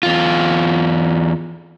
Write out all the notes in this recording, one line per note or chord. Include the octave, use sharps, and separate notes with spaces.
E2 F4